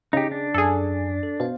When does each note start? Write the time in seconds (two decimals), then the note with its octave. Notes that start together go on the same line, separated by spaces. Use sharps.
0.13 C#3 D#4 G4 G#4
0.31 D4
0.54 F#2 G#4 A4
1.23 A4
1.40 B2 C5 F5